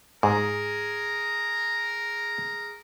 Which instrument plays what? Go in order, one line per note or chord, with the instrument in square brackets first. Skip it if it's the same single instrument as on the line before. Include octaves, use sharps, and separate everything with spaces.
[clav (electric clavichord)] G#2 [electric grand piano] G#4 [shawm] A#4